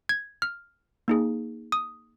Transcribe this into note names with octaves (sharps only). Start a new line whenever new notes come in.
G#6
F6
A#3 D#4 G#4
D#6